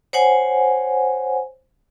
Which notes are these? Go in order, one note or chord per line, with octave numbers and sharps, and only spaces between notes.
C5 C#5 F#5 G#5